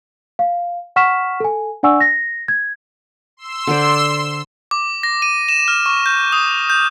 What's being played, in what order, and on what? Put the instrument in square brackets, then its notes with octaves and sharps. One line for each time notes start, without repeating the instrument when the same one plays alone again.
[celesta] F5
F#5 C#6 F6 B6 E7
A4 G#5
D4 D5 F#5 G#5 C#6 E6
A#6
G#6
[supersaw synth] C6 E6
[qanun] D3 C5 D5
[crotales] D6
A#6
D#7
E7
F6
C#6
G6
D#6
G6